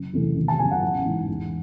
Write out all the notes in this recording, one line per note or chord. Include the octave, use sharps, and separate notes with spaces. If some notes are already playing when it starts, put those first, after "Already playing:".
Already playing: F#1
E2 C3 E3 A3
G#1
A5
F#2 C#3 G#5
F#5
A1
G#2 E3
E2